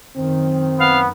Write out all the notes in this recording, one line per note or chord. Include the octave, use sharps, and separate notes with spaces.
F#2 D#3 C4
B3 F5